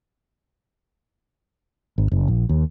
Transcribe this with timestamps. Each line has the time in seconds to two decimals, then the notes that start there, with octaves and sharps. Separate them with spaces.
1.98 G#1
2.12 F#1
2.28 A#1
2.49 D#2